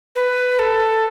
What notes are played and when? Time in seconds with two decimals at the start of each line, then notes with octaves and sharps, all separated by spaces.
0.16 B4
0.59 A4